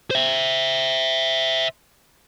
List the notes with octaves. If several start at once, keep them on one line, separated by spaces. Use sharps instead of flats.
C5 E5